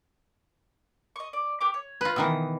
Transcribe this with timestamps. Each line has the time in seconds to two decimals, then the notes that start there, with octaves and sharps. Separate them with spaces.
1.16 D#5 C#6
1.33 D5
1.61 G4 B4 D6
1.74 C#5
2.01 F4 B4
2.16 B2 D#3 E3 D#6 E6